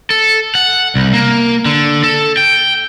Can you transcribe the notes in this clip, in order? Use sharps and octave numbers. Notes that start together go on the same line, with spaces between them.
A4
F#5
C2
A#3
D3
A4
G5